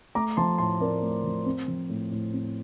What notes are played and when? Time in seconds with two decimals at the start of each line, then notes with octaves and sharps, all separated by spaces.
0.15 A3 A#5 D6
0.37 F3 A5 C6
0.58 A2 A5 C6
0.81 C4 A#4 D5
1.03 A3
1.24 F3
1.46 C4
1.68 F3
1.89 A2
2.11 A2
2.33 C4